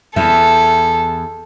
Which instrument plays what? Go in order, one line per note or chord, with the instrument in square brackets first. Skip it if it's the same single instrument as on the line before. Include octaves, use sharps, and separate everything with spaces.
[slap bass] E2 [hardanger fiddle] A4 [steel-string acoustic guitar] E5